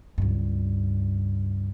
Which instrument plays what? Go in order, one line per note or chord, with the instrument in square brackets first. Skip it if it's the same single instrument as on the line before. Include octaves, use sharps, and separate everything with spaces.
[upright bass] C#2 G2